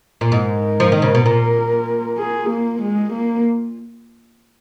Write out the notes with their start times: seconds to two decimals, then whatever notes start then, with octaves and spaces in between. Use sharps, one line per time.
0.21 A#2
0.32 G#2 A#4
0.80 F3
0.92 D#3
1.02 C#3
1.15 B2
1.26 A#2
2.18 G#4
2.50 A#3
2.82 G#3
3.13 A#3